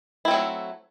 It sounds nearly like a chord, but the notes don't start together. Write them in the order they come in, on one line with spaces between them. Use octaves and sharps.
E4 C4 A3 F#3